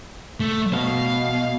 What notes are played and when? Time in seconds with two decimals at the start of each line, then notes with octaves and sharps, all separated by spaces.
0.40 A3
0.73 B2 F5